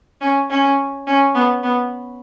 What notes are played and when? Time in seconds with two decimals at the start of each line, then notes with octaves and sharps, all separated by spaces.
0.21 C#4
0.50 C#4
1.07 C#4
1.34 B3
1.63 B3